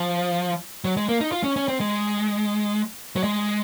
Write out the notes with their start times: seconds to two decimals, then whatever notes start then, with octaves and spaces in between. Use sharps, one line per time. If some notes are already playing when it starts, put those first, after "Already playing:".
Already playing: F3
0.84 F#3
0.97 G#3
1.08 A#3
1.21 D#4
1.32 F4
1.44 C#4
1.56 C#4
1.68 C4
1.80 G#3
3.16 F#3
3.24 G#3